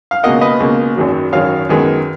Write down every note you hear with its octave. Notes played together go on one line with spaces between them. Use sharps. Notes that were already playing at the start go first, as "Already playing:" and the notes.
F5
C#2 B2 A#3 D#5 F#5
B4 D#5
C#2 B2 A#3
G#1 F#2 D#3 F#3
G#1 F#2 D#3 F#3 C#5 F5
F#2 D#3 G#3 B3